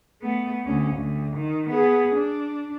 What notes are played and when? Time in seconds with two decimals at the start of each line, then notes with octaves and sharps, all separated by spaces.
0.22 A3 B3
0.65 D2 C#4
0.97 D2
1.37 D#3
1.70 B3 G#4
2.16 D4